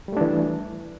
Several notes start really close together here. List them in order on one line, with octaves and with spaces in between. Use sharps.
G3 A3 D4 E3